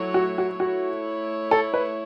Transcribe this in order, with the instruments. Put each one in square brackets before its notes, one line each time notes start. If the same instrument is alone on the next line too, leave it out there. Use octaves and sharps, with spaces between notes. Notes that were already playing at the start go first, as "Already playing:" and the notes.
Already playing: [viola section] F#3 A3 E4 C#5
[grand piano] F#4
F#4
[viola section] A3 E4 C#5 [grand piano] F#4
[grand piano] A4
B4